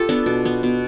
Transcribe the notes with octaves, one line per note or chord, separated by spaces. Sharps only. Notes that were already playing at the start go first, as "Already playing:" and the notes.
Already playing: F4 G4 A4
B3 D4
B2
B3
B2